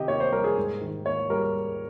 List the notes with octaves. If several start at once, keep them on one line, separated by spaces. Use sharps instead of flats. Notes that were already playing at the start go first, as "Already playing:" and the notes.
Already playing: C3 D#3 G4 D#5
A#3 C#5
C5
G3 A#4
G#4
G#2
D#3
A#3 C#5
G3 A#4